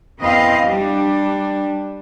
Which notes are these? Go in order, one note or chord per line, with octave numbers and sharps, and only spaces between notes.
E2 C4 B4 D#5 F5
G3 D4